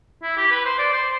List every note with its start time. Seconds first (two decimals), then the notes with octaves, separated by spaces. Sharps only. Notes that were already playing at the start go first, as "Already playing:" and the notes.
0.23 E4
0.37 G4
0.51 B4
0.65 C5
0.79 D5
0.93 C5